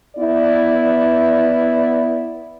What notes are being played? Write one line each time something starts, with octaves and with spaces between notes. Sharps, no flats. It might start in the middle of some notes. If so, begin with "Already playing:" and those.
B3 E4 D5